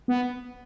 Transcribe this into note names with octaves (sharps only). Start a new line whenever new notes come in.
B3